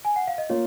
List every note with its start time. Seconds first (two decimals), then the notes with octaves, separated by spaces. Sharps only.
0.05 G#5
0.16 F#5
0.27 F5
0.38 D#5
0.50 A#3 F4 C#5